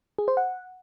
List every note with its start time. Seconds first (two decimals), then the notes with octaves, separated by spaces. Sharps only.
0.18 G#4
0.28 C5
0.37 F#5